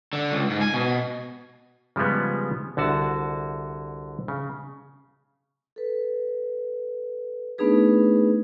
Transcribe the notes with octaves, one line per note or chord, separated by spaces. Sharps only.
D3
C#2
G#2
G#5
B2
C#3 F3 G3 G#3 B3
C2 D3 F#4 A5
C#3
A4 B4
A3 B3 D4 D#4 G#4 B4